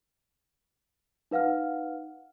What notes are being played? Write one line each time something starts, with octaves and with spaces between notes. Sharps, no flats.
D#4 B4 F5 F#5 F6